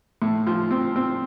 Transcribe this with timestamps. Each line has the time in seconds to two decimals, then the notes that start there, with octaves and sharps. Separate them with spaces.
0.22 A2
0.47 F3
0.71 C4
0.96 C4